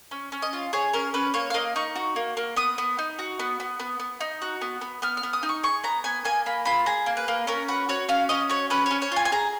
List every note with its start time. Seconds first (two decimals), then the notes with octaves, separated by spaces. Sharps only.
0.11 C#4
0.32 C#4
0.42 D#5
0.53 F4
0.73 G#4 C#5
0.93 C#4 A#4
1.14 C#4 B4
1.34 A#3 C#5
1.50 F5
1.54 A#3 D#5
1.76 D#4 C#6
1.96 F#4
2.16 A#3
2.37 A#3
2.56 B3 D#6
2.78 B3
2.99 D#4
3.19 F#4
3.39 B3
3.60 B3
3.80 B3
4.00 B3
4.21 D#4
4.42 F#4
4.61 B3
4.81 B3
5.02 B3 F6
5.17 F6
5.23 B3
5.33 D#6
5.43 D#4
5.49 C#6
5.63 G#4 C#6
5.84 B3 A#5
6.04 B3 G#5
6.25 A#3 G#5
6.46 A#3 B5
6.65 F4 B5
6.86 G#4 A#5
7.06 A#3
7.17 B4
7.28 A#3
7.47 C#4 A#4
7.68 F#4 B4
7.89 F#4 C#5
8.09 C#4 F5
8.29 C#4 D#5
8.49 F#4 C#5
8.70 C#4 B4
8.86 C#4 C#5
9.02 C#5
9.12 F4 G#5
9.25 G#5
9.32 G#4 A#5